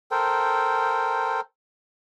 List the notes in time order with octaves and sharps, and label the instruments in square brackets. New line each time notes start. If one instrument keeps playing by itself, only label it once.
[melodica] A4 A#4 C5 G5